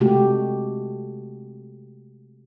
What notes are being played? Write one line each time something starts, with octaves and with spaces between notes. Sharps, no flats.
C3 G#3 A3 F#4 G4